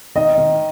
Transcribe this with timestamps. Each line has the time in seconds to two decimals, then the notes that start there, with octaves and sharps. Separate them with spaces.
0.15 D#3 D#5
0.38 D#3